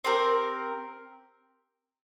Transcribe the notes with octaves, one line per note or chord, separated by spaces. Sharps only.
C4 G4 A#4